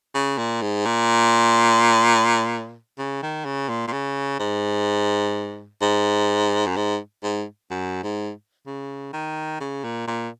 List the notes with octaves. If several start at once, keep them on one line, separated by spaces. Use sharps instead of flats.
C#3
A#2
G#2
A#2
C#3
D#3
C#3
A#2
A#2
C#3
G#2
G#2
F#2
G#2
G#2
F#2
G#2
C#3
D#3
C#3
A#2
A#2